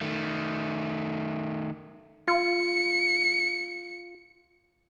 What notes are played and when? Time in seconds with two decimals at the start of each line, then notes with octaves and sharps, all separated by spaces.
0.01 D#3 A3
2.28 F4 C#7